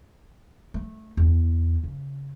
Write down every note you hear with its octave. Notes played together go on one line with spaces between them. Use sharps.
A3
E2
C#3